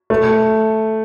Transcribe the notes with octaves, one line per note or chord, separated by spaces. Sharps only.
A3